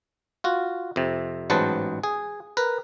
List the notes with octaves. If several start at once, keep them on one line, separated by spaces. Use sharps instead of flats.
F4 F#4
F2 C3
A1 G#2 F#3 B4 C5 A5
G#4
A#4 B4